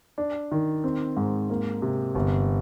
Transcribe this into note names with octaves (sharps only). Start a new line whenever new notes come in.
D4
D#3
C4
G#2
A#3
C3
G1